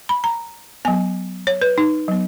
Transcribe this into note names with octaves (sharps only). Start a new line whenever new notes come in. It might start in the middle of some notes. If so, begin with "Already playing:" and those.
B5
A#5
F#3 B3 G#5
C#5
B4
D#4
F#3 B3